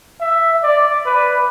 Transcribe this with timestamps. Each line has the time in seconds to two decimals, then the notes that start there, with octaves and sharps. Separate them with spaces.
0.20 E5
0.63 D5
1.05 B4